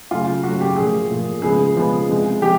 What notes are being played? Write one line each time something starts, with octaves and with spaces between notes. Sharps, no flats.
C#3 F#3 A3 F4
C#3 F#3 A3 F#4
G4
A#2 F3 A3 G#4
A#2 F3 A3
C#3 F3 G#3 B3 G#4
C#3 F3 G#3 B3
C3 F3 G#3
F3 G#3 G4